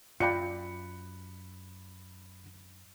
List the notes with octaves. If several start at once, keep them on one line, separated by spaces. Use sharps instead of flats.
F#2 F4 D5 G5 B5 F#6 C#7